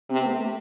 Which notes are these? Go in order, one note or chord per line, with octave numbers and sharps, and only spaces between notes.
C3 C4
B3
A3